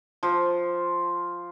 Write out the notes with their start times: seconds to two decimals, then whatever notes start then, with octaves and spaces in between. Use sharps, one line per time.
0.23 F3